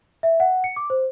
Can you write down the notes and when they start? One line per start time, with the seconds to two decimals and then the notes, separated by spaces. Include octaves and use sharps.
0.23 E5
0.40 F#5
0.64 C#7
0.76 D6
0.90 C5